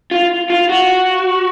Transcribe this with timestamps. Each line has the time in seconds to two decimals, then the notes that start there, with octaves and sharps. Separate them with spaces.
0.11 F4
0.50 F4
0.69 F#4